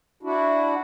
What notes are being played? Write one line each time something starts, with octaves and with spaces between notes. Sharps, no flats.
D4 E4 F#4